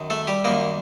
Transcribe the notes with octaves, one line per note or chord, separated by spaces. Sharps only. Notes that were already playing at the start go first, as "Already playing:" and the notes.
Already playing: F#2 D#3
A3 A4
G3 G4
F#2 D#3 G3 A#3 A#4